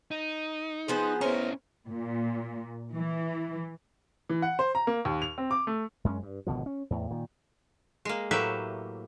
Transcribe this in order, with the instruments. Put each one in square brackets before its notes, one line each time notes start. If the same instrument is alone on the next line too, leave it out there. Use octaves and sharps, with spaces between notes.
[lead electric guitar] D#4
[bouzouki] F3 B3 C5 [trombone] G#4
[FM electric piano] B3 C5 C#5 [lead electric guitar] C#4 E4 [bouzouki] A#4
[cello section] A#2
E3
[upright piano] E3
F#5
C5
A#5
A#3
D#2
F7
C4
D6
A3
[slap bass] F#2 G#3 C4 C#4
G2
G#1 B2 D3 F3
C#4
E2 A2
A#2 D#3
[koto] G#3 A#3
A2 F#3 A#3 G4 B4 E5